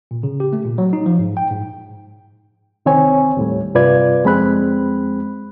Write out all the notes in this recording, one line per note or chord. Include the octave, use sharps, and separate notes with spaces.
A#2
C#3
G4
A3
A#2
F#3
D#4
F3
G#2
G5
G#2
C2 D#3 C4 C#5 G#5
D#2 A2 G3
G2 C3 F4 B4 D5 G#6
F2 G#3 C4 B5 F#6